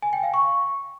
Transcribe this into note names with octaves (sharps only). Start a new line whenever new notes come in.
G#5
G5
F5
C#6